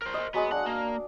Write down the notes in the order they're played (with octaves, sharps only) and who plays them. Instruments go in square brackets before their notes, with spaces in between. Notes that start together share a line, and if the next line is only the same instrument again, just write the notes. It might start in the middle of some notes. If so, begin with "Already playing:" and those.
[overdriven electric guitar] A#4 C5
[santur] D#5 C#6
[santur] F#3 G#3 D#5 [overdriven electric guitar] B3
[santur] D4 F5 [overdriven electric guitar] F#5
[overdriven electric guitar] A#3